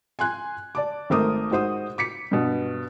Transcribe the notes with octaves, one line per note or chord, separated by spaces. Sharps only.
G#5 C6 F#6 G#6
D5 A5 D6
G#1 A3 A#4 C5 D6 D#6
G#2 F#4 C5 D#6
D6 B6 C#7
G2 B2